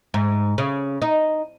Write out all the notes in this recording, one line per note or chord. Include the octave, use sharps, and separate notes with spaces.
G#2
C#3
D#4